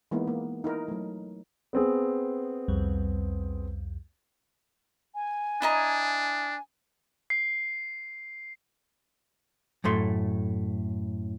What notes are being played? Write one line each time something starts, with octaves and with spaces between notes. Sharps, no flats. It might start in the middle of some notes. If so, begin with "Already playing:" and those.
E3 G#3 A#3 B3 D#4 E4
A#3
D#4 E4 A#4
F#3 A3
B3 C4 G#4
C2 F2 G3
G#5
D4 E4 D#5 A#5
C7
F#2 A2 A3 C6